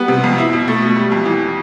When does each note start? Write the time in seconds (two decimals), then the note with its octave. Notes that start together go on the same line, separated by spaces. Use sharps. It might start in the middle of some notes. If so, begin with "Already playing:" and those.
Already playing: G3 B3
0.08 C3
0.24 F2
0.38 E4
0.53 B2
0.68 A3
0.82 B2
0.96 G3
1.12 F2
1.25 E3